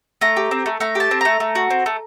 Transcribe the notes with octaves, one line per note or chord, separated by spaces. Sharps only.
A3 A#5
G4
C4
A3
A3 A#5
G4 A5
C4
A3 A#5
A3
F#4
C4
A3